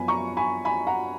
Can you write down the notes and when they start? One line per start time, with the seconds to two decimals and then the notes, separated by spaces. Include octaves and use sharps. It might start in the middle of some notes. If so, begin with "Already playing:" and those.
Already playing: F#2 F3 B3 G#5 B5
0.08 A#5 C#6
0.37 G#5 B5
0.65 G#5 B5
0.87 F#5 A#5